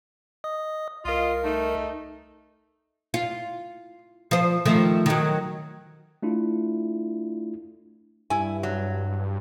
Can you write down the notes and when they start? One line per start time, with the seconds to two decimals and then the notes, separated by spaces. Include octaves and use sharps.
0.44 D#5 D#6
1.05 C2 F4 A#4 D#5
1.44 A3 D#4
3.14 F4
4.31 F3 C5
4.65 D#3 F3 A3
5.06 D#3 F#3
6.22 A3 D4 E4 F4
8.30 G2 E4 G#5
8.63 F#3